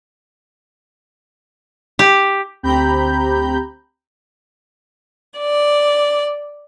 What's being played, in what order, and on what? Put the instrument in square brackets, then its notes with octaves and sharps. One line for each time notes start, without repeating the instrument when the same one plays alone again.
[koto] G4
[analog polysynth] D2 C4 G4 A#5 B5 G6
[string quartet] D5